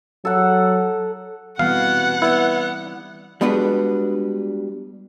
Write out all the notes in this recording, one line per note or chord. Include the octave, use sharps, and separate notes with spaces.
F#3 A4 F#5
B2 E3 G3 C4 F5 F#5
B3 E4 B4 D5
G3 G#3 B3 D4 F#4 B4